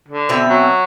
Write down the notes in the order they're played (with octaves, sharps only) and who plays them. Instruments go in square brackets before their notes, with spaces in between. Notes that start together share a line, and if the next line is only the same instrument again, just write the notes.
[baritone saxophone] D3
[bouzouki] B2 C4 E5
[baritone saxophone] F#3